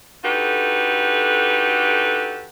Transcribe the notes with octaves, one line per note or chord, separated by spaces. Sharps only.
D3 D#4 F#4 G4 A4 B4